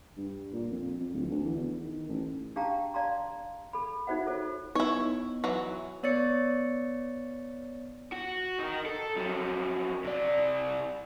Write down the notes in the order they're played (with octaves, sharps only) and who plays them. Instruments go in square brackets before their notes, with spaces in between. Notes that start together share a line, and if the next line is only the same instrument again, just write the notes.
[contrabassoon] G2
A#2
F2
F2
D1
D2
E3
E2
D#3
A1
[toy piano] D4 G4 F5 G5 A5 A#5
D5 F5 A5 A#5 C6
A4 B5
D#4 F#4 C5 E5 F#5
F4 A4 C5 C#5
[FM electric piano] B3 D#4 [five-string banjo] E4 C#5
[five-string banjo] E3 F#3
[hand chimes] B3 C#5 D5 A6 C#7
[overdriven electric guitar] F#4
D#4 A#4
A4
F2 F#3
C3 D5